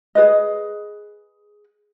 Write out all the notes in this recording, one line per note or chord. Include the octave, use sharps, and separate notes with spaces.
G#4 B4 D#5